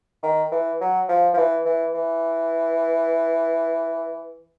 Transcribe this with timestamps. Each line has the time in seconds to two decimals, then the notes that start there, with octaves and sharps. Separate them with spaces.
0.23 D#3
0.52 E3
0.81 F#3
1.09 F3
1.34 F3
1.38 E3
1.65 E3
1.94 E3